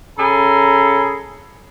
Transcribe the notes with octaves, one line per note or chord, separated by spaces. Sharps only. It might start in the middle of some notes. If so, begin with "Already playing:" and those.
C#3 G#4 A4 A#5 B5